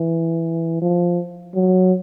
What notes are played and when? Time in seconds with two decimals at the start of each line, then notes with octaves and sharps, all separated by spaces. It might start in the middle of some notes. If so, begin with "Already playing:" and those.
Already playing: E3
0.81 F3
1.54 F#3